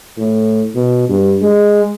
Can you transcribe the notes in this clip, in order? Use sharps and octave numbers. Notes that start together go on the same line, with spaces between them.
A2
B2
G2
G#3